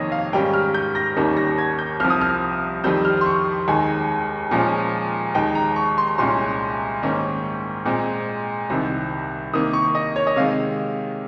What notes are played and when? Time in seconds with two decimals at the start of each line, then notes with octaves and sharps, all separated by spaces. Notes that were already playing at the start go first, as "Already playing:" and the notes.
Already playing: F2 C3 D#3 A#3 C#5 D#5
0.12 F5
0.33 G#2 D#3 G3 C#4 G5
0.54 F6
0.74 G6
0.95 A#6
1.16 D#2 D#3 G3 A#3 C#4
1.37 A#6
1.58 G#6
1.79 G6
2.00 C2 C3 F3 F6
2.10 D#6
2.21 F6
2.84 F2 D#3 G3 C4 G6
3.05 F6
3.21 C6
3.26 C#6
3.68 D#2 D#3 G#3 G#5
4.51 A#2 F3 G#3 C#4
5.35 D#2 D#3 G#3 G5
5.55 A#5
5.76 C#6
5.98 C6
6.18 C2 A#2 G#3 C#4 C6
7.03 G#2 D#3 A#3 C#4
7.86 A#2 G#3 C4
8.70 C2 C3 D#3
9.53 C3 D#3 A#3 D#6
9.73 C#6
9.95 D#5
10.16 C#5
10.27 D#5
10.36 C3 D#3 G#3 F5